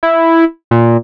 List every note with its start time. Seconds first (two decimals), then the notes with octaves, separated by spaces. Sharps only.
0.03 E4
0.71 A#2